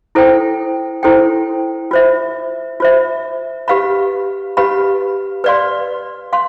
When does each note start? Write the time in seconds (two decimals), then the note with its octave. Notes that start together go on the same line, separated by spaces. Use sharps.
0.15 E4 A4 C5 G5
1.03 E4 A4 C5 G5
1.91 F4 C5 E5
2.80 F4 C5 E5
3.68 G4 B4 F5 B5
4.57 G4 B4 F5 B5
5.44 B4 D5 F5 C6
6.33 F5 C6